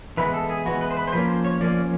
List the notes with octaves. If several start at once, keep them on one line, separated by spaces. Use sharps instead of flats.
E3 G#3 B3 B4
A4
G#4
E3 G#3 B3 F#4
B4
C5
B4
C5
F3 A#3 C#4 B4
C5
C#5
F3 A#3 C#4 D5